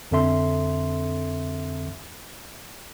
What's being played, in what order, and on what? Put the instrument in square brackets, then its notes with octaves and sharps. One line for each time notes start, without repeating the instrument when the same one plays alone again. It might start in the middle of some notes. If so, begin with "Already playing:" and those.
[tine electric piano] F2 D3 C4 A4 E5 C6